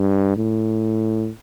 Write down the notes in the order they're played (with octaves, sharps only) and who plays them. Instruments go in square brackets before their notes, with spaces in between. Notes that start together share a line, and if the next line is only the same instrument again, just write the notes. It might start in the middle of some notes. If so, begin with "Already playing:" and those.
Already playing: [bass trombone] G2
A2